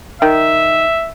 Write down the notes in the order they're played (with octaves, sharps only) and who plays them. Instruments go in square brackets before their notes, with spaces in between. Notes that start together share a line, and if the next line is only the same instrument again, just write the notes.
[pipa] D#3 [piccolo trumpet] E5